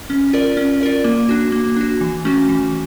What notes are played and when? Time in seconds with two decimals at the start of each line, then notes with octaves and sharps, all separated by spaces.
0.10 C#4
0.33 F4 A#4 D5
0.57 C#4
0.81 F4 A#4 D5
1.04 A#3
1.29 D4 F#4
1.52 A#3
1.76 D4 F#4
2.01 E3
2.25 A3 C#4 F#4
2.49 E3